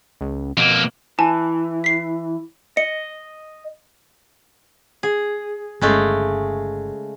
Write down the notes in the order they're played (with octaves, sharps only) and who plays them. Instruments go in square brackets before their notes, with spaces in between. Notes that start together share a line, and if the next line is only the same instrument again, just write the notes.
[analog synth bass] C#2
[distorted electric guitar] F2 A#3 [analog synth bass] B2
[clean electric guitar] E3 [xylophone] G#5 A5
[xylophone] B6 C7
[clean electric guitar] D#5 [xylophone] C#7
[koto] G#4
[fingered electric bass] G1 [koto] C#3 G#3 A3